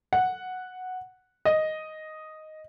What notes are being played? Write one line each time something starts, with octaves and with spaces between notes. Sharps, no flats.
F#5
D#5